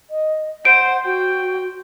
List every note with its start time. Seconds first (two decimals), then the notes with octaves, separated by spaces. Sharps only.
0.10 D#5
0.65 C5 F#5 D7
1.04 F#4 G5